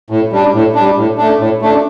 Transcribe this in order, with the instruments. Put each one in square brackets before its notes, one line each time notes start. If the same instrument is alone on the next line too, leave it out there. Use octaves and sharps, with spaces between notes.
[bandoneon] A2
G3 D4
A2
D4
G3
A2
A3 D4
A2
A3 D4